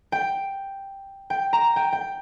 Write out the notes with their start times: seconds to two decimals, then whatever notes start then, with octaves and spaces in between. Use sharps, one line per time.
0.12 G5
1.30 G5
1.53 A#5
1.76 G5
1.93 G5